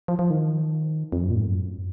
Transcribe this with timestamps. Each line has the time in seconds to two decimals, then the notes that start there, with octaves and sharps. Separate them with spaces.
0.08 F3
0.19 F3
0.30 D#3
1.12 F2
1.24 F#2
1.30 A#2
1.36 G#2
1.47 F#2